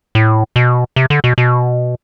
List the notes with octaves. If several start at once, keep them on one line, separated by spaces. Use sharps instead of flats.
A2
B2
C3
D3
B2
B2